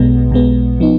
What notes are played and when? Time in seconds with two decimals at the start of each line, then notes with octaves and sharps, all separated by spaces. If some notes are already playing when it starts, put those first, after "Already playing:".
Already playing: B1 B2 G#3 B3
0.31 B1 B2 G#3 B3
0.80 F3 B3 D#4